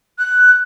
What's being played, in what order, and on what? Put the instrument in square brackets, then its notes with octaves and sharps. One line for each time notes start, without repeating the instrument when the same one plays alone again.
[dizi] F#6